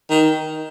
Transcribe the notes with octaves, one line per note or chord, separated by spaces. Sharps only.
D#3